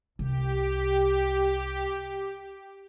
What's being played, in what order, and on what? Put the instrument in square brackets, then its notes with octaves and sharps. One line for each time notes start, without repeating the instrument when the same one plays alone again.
[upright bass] C2 [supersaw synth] G4